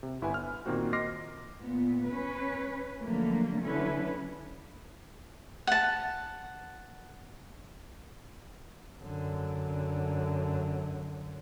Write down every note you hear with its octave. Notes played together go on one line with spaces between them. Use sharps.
C3
G1 E4 B4 G#5
F6
A#2 D#3 A#3 C4 F#4
D#5 C6 D6 F6 A#6 C7
A#2 B3
C#4 B4
D3 F3 F#3 A3 A#3
D3 F#3 C#4 E4 B4
F#5 A5
F#2 D3